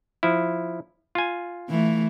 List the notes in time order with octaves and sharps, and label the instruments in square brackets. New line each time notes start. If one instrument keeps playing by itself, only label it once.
[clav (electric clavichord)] F3 E4
F4 G#5
[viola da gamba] E3 A3